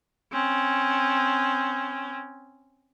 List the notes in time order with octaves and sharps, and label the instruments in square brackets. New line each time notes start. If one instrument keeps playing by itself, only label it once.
[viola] C4 C#4